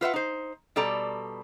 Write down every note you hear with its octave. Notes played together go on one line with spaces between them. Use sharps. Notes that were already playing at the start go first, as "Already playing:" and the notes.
F4 B4 E5 F#5
D#4 C5
B2 G3 A4 D5 A#5